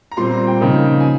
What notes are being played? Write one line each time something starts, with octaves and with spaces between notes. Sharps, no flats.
A#5
A#2 G3 C4 C6
A#5
G5
C#3 F3 A#3 D#4
G#5